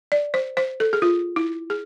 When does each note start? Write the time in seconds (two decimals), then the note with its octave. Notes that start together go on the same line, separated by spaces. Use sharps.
0.12 D5
0.34 C5
0.57 C5
0.80 A4
0.93 G#4
1.02 F4
1.36 E4
1.70 G#4